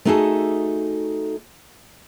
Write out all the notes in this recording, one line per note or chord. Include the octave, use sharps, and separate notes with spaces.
A3 B3 D#4 F#4 G#4 A4